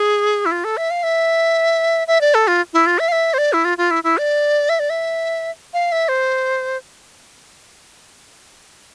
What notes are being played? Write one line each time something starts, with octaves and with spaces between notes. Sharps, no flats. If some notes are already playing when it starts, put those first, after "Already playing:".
Already playing: G#4
E4
F4
A4
E5
F5
E5
E5
D5
A4
F4
E4
F4
E5
F5
E5
C5
D5
E4
F4
F4
E4
E4
D5
E5
D5
E5
F5
E5
C5